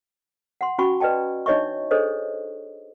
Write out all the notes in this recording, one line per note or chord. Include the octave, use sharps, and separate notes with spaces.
F#5 C6
C#4 F#4 G#5 B5 C#6
B4 D5 D#5 G5 A5
D4 D#4 C#5 D#5 E5 C#6
D4 G#4 A4 C5 C#5 D#5